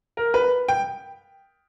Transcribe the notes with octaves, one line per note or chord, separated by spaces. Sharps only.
A#4
B4
G5